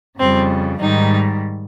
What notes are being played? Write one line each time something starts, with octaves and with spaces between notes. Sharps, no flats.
F2 C#3 G3 C4
G#2 D#3 G3 D#4